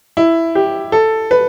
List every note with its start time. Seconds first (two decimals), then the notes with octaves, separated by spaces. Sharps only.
0.17 E4
0.55 G4
0.92 A4
1.31 B4